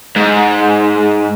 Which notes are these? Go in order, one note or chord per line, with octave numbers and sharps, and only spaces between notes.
G#2